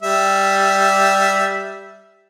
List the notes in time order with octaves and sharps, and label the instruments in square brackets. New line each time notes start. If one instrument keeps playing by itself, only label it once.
[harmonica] G3 E5